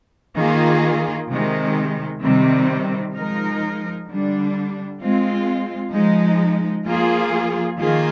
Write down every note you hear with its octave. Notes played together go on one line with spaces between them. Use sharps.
D#3 A#3 F4 G#4
C3 D#3 G#3
C3 D#3 G3 C4
F3 G#3 D#4 A#4
D3 G3 D4
G#3 C4 F4
F3 G#3 D#4
F3 A#3 F4 G#4
D#3 A#3 F4 G#4